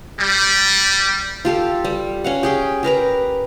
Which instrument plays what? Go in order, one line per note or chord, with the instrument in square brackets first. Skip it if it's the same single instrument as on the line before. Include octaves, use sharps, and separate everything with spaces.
[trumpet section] G3
[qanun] F4 G4 A4 F5
G3
C#4 F5 F#5
G4 G#4 G5
G4 A#4 B4 A#5